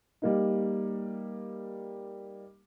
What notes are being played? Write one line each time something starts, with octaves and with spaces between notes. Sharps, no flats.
G3 A#3 D#4